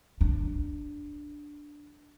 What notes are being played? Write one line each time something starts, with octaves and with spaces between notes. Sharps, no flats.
D4